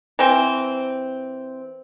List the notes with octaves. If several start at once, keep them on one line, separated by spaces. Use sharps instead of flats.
E3 C4